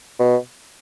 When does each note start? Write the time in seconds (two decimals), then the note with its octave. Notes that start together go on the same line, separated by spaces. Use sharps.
0.19 B2